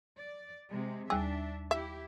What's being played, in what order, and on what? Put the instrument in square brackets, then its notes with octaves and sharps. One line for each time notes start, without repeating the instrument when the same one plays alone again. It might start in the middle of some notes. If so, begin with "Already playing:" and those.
[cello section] D5
C3 G#3
[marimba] D#2 G3 E6 [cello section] D4 E5 [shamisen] G#4
[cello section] E4 G4 [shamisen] E5